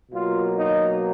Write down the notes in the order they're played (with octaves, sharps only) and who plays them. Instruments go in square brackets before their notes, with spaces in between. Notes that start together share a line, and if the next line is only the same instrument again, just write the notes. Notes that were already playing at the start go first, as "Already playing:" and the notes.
[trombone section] B2 F#3 A#3 F4
D#4